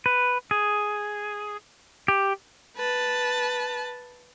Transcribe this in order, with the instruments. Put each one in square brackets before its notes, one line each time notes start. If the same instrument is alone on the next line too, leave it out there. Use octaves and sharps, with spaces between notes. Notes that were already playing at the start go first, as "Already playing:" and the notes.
[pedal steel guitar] B4
G#4
G4
[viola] B4 A5